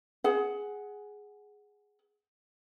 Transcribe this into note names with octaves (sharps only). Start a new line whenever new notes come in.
G#4 F#5